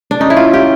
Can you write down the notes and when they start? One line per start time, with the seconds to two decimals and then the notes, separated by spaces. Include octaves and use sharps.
0.11 D4
0.20 C#4 D#4
0.30 E4
0.37 F4
0.53 E4 G4